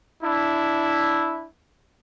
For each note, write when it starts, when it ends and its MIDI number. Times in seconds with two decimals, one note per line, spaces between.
0.23 1.47 62
0.23 1.47 64